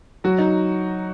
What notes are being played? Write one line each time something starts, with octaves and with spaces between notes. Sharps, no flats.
F#3 F#4
D#4